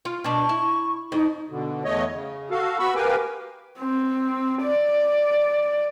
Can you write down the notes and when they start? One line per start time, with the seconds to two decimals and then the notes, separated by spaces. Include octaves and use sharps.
0.05 F4
0.24 B2 D4 C#6
0.49 E4
1.12 F2 D#4
1.50 B2 D3
1.84 E2 A3 C#5 D#5
2.12 C#3
2.50 F#4 A4 F5
2.79 B3 F#4 B5 C#6 E6
2.95 G4 A#4 B4 F5 G5 G#5
3.79 C4
4.62 D5